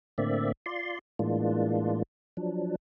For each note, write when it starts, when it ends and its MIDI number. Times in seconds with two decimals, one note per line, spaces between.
0.18 0.52 45
0.18 0.52 50
0.18 0.52 58
0.18 0.52 60
0.18 0.52 74
0.18 0.52 76
0.66 0.99 65
0.66 0.99 74
0.66 0.99 84
1.19 2.03 45
1.19 2.03 52
1.19 2.03 56
1.19 2.03 58
1.19 2.03 62
1.19 2.03 65
2.37 2.76 53
2.37 2.76 54
2.37 2.76 62